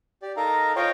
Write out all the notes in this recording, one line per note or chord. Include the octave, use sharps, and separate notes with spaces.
G4 D5
D#4 A4 A#4 F5 A#5
F4 C5 C#5 D#5 F5 G5